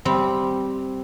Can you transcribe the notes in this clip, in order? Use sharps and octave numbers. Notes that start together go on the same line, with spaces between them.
G3 C4